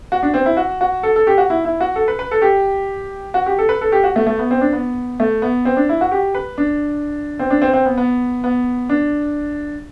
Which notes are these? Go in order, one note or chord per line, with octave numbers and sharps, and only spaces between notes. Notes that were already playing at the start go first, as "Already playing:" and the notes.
F#4
D4
C4
E4
F#4
F#4
A4
A4
G4
F#4
E4
E4
F#4
A4
B4
B4
A4
G4
F#4
G4
A4
B4
A4
G4
F#4
A3
A3
B3
C4
D4
B3
A3
B3
C4
D4
E4
F#4
G4
B4
D4
C4
D4
C4
C4
B3
B3
B3
D4